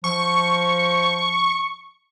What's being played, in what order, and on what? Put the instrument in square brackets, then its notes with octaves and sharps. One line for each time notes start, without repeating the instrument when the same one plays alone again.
[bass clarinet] F3 [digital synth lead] C#6